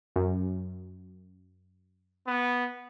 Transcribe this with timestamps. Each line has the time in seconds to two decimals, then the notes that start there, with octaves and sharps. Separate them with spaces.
0.16 F#2
2.27 B3